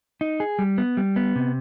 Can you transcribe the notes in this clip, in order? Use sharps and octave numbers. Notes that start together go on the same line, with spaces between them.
D#4
G#4
G3
B3
G3
B3
C3